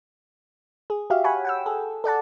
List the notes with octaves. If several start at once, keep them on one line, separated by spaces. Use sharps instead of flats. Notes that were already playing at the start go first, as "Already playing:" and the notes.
G#4
F#4 G4 E5 F5
C#5 F#5 G#5 B5
F#5 G5 E6
G#4 A4
A4 D5 F#5 A5